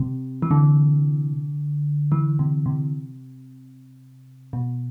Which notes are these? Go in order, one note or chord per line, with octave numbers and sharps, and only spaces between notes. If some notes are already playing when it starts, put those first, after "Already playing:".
Already playing: C3
E3
D3
E3
C3
C3
B2